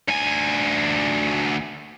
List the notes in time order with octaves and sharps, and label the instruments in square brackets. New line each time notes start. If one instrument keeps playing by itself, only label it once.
[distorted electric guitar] D2 G#5